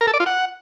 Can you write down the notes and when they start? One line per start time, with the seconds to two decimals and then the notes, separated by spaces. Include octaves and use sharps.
0.01 A#4
0.07 A4
0.14 D5
0.20 F4
0.26 F#5